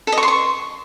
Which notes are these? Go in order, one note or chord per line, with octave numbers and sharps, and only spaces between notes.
A4
D#5
C#6
C6
C#6